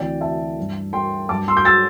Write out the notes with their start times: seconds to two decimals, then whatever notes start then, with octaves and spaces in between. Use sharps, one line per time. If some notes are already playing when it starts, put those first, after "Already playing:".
Already playing: D2 C3 E3 D5 G5
0.21 E5 A5
0.58 G2 G3
0.93 G5 C6
1.29 G2 G3 A5 D6
1.48 C6 E6
1.57 D6 G6
1.65 E6 A6